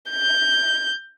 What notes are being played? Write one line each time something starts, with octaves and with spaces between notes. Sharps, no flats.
G6